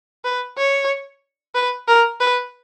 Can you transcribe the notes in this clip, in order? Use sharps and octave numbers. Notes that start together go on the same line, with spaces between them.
B4
C#5
B4
A#4
B4